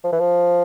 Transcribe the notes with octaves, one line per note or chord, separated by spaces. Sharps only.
F3
E3
F3